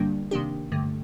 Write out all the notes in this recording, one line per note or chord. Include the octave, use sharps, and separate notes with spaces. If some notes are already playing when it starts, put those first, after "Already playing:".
Already playing: G2 D3 G3 A#3 D4
C3 D#3 A#3 D4 G4
G2 D3 A3